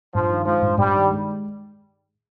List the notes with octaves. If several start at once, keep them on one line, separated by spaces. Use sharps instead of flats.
G2 F3
D#3
F3 G#3
G2
G2 G3
D#3
G#3